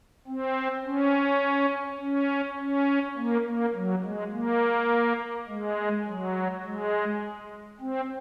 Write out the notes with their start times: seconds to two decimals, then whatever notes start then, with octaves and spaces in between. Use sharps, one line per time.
0.27 C4
0.85 C#4
2.01 C#4
2.58 C#4
3.17 A#3
3.46 A#3
3.75 F#3
4.04 G#3
4.32 A#3
5.48 G#3
6.07 F#3
6.64 G#3
7.81 C4